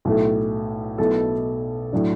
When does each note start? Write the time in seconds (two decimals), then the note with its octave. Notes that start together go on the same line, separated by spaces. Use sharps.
0.05 B1 A2 A3
0.98 B1 B2 A3 E4 A4
1.93 A2 F#3 D4